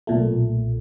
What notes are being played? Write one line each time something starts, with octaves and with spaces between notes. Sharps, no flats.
B1 A#2 A3